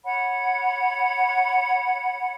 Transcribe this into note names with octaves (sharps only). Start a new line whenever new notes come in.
C#5 F#5 B5